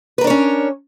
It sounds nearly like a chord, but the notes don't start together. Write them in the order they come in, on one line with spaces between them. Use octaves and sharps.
B4 A#4 D4 C#5 C#4